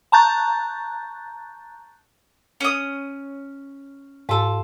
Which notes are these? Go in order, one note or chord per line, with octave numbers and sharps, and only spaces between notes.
A5 A#5 C#6 F#6 G6 A6
C#4 D#6
G#2 F4 A4